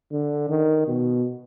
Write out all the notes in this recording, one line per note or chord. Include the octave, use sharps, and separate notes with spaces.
D3
D#3
B2